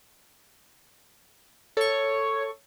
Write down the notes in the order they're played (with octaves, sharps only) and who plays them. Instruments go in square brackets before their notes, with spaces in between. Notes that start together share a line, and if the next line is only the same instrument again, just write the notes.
[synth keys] A4 C#6 [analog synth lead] C#5